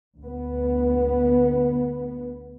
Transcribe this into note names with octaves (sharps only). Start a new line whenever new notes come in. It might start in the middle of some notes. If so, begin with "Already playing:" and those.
D2 B3